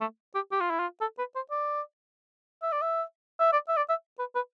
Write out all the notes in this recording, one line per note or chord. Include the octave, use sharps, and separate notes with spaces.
A3
G4
G4
F4
E4
F4
A4
B4
C5
D5
E5
D5
E5
E5
D5
E5
D5
E5
B4
B4